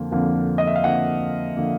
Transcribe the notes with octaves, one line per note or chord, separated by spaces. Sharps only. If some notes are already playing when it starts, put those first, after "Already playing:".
Already playing: F2 D3 F3 A#3
F2 D3 F3 A#3
D#5
E5
F5
F2 D3 F3 A#3 F#5
D3 F3 A#3